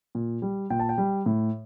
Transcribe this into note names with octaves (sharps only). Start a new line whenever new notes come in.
A#2
G3
A#2 G5
A5
G5
G3
A2